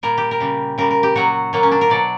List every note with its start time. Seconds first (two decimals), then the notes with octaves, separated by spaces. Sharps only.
0.03 A#2 G3 A#4
0.18 G4
0.31 A#4
0.40 C#3 G3
0.78 C#3 G3 A#4
0.90 A#4
1.03 G4
1.16 A#2 F#3 F#4
1.53 A#2 F#3 A#3
1.63 C#4
1.72 D4
1.81 A#4
1.90 B2 F#3 D5